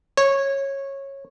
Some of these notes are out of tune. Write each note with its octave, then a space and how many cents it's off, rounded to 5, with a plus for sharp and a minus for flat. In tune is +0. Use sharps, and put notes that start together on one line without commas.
C#5 -15